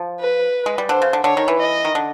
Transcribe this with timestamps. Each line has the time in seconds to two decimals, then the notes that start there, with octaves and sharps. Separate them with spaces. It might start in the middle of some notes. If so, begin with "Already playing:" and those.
Already playing: F3
0.20 B4
0.66 G#3
0.78 G3
0.89 D3 C5
1.02 C#3
1.13 D3
1.24 D3 C#5
1.37 D#3
1.48 E3
1.59 D#5
1.85 D#3
1.95 D3